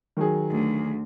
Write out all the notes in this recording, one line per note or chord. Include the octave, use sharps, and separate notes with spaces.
D#3 F#3 G#4
D2